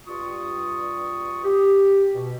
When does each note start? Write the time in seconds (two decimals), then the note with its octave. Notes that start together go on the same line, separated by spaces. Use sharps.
0.08 G2 F4 C#6 D#6
1.44 G4
2.15 B2